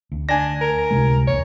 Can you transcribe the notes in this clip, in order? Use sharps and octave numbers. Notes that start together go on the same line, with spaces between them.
D2
D4 G#5 A#6
A#4
C#2 C3 G#3
E1 A#1 C#5